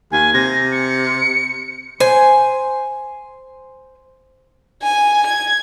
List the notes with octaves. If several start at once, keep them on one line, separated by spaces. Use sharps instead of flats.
D#2 G#5
C3 A#6
C#7
C5 G#5
G#5
G#6